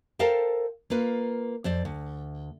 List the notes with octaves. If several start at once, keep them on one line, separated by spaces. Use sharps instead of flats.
A4 A#4 C5 F5 G5 A5
A#3 F4 B4
F2 C5 D5
D2